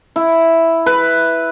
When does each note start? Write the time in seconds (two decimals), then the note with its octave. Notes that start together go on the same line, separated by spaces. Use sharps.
0.16 E4
0.86 B4